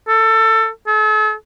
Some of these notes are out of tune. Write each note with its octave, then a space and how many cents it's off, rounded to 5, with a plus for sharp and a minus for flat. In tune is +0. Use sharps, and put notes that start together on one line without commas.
A4 +20
A4 -40